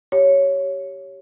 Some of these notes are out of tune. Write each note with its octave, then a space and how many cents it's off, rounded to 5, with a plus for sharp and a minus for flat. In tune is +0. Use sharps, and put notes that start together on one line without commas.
G4 -10 C#5 +0